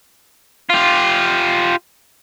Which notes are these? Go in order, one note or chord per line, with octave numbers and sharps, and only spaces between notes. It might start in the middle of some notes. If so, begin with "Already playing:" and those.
F4 G4